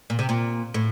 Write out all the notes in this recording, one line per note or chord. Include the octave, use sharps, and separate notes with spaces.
A#2
C3
A#2
A2